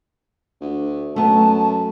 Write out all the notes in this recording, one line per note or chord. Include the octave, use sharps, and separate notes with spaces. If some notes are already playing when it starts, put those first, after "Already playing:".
D2
F#2 A3 B3 A5